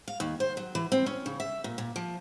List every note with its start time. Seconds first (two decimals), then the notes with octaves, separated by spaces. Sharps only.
0.08 F5
0.20 D#2
0.40 C5
0.57 F#3
0.75 E3
0.92 C4
1.06 C#4
1.26 C#3
1.40 E5
1.64 A#2
1.78 A#2
1.96 F3